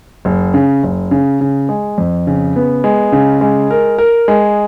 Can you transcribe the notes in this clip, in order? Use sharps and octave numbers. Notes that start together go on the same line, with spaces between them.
F#1
C#3
F#1
C#3
C#3
G#3
F2
C#3
B3
G#3
C#3
G#3
A#4
A#4
G#3